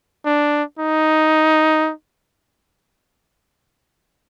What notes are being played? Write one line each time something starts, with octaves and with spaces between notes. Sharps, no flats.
D4
D#4